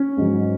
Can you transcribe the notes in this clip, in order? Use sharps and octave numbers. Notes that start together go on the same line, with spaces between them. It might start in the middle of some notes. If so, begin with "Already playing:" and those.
Already playing: C#4
G#2 F#3